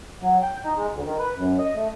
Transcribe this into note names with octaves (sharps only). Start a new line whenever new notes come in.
F#3
G5
D#4
G#3
D2
D#3
B4
F#2
D#5
A3